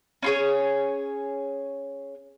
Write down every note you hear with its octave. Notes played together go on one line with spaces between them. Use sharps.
C#4 F4 G#4 C#5